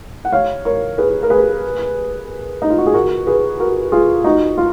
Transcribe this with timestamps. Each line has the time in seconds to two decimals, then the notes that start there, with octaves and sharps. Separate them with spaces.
0.25 F#5
0.33 C#5 F5
0.65 A#4 C#5
0.98 G#4 B4
1.23 A#4
1.30 G#4 B4
2.62 D#4
2.70 F4
2.78 F#4
2.86 G#4
2.94 F#4 A#4
3.27 G#4 B4
3.60 F#4 A#4
3.92 F4 G#4
4.24 D#4 F#4
4.58 F4